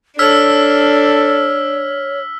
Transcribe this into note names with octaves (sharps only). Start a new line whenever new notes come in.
D4 A4 C#5 E6 F6 B6